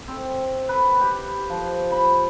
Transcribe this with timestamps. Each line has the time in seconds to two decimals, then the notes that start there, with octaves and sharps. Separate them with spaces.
0.08 C4
0.69 B4
1.01 G4
1.50 F3
1.92 B5